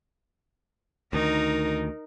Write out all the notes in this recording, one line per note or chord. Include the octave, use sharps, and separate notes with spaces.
D2 D#3 D#4 A#4